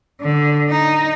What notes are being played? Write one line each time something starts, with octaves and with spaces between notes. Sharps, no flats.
D3
D#4